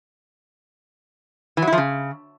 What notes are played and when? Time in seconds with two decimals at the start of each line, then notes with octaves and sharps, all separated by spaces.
1.57 E3
1.62 F#3
1.67 E4
1.73 F3
1.78 C#3